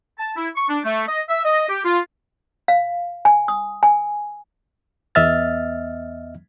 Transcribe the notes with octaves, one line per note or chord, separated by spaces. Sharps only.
A5
E4
C#6
D4
A3
D#5
E5
D#5
G4
F4
F5
G#5
D#6
G#5
E2 B3 D#5 E5 F6 A6